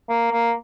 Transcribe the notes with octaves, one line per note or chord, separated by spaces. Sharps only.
A#3
A#3